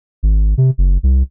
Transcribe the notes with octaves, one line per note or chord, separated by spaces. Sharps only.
G#1
C3
F#1
C2